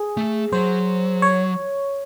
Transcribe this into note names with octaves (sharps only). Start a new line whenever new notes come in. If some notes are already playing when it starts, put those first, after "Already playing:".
Already playing: G#4
A3
F#3 C5
C#5